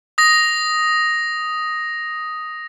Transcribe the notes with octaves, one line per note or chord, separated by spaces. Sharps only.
D#6 A#6